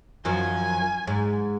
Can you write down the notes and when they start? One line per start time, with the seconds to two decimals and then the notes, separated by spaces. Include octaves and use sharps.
0.25 F#2 D#3 F3 G#5
1.07 G#2